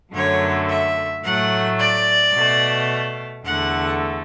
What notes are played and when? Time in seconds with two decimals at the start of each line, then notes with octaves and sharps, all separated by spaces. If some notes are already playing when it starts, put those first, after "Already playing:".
0.12 F#2 D3 F#3 A3 C#5
0.68 E5
1.23 A2 F#3 A3 F#5
1.79 D5
2.33 B2 A3
3.44 E2 D3 A3 F#5